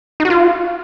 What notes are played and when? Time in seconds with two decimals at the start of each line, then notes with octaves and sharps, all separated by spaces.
0.20 D#4
0.25 F#4
0.30 F4